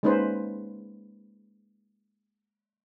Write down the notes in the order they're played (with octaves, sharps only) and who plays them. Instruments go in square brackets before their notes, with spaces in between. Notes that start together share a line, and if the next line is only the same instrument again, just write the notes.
[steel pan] G#3 A#3 C#4 D#4 B4 C5